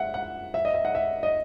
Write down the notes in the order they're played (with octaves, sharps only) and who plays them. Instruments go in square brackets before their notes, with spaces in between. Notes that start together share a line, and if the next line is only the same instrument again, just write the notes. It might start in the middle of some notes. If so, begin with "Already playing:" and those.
Already playing: [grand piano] E5 F#5
F#5
E5
D#5
E5
F#5
E5
D#5